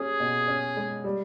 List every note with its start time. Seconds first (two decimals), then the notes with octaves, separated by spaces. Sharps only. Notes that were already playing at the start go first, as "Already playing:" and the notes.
Already playing: C#4 G4 G#4
0.20 B2
0.48 C#4
0.77 G#3
1.04 G3